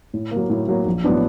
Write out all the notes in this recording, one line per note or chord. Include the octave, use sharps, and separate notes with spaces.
A2
F#3 A#3
A2
F#3 A#3
A#1
A2 F#3 B3 D4